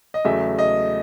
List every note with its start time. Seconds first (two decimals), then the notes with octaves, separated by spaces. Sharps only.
0.14 D#5
0.24 E2 C#3 F#3 A3 E5
0.59 D#5